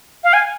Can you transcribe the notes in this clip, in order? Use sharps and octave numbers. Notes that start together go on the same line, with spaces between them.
F5
G#5